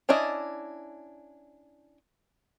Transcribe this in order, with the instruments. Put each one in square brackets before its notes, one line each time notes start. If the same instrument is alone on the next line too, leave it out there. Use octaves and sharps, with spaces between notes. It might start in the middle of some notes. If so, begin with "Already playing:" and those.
[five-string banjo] C#4 D4 E4 D5 D#5